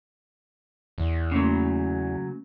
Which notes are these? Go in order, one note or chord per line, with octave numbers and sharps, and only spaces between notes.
E2
C#3 F#3 A3 A#3 C#4